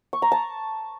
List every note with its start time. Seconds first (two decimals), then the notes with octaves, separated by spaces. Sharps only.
0.13 C#6
0.22 A#5
0.32 A5